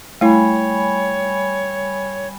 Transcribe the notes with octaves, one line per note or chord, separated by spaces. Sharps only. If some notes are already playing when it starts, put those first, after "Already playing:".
G3 A3 E4 C#5 G#5 B5